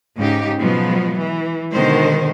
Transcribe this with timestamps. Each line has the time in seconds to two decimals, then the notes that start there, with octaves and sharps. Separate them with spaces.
0.17 G#2 C#3 D#4 G4
0.60 B2 F3 F#3 G#3 B3
1.20 E3
1.73 B2 D3 D#3 G#3 C5